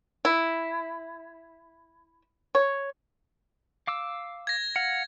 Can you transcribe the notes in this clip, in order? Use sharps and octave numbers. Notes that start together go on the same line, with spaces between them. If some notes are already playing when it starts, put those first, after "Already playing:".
E4
C#5
F5 D6 E6
G#6 A#6
F5 F#5